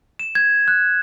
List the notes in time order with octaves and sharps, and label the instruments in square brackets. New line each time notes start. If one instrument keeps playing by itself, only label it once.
[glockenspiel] E7
G#6
F#6